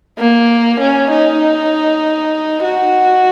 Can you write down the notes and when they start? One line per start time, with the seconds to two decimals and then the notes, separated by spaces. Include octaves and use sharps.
0.19 A#3
0.80 C#4
1.11 D#4
2.64 F#4